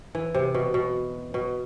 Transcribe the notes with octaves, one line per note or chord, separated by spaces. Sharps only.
E3
C3
B2
B2
B2